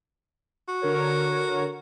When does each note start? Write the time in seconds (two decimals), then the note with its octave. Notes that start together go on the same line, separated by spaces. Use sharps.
0.69 F#4
0.81 D3 A#4 C#5